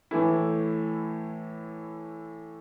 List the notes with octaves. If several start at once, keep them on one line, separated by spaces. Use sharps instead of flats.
A2 E3 A3 E4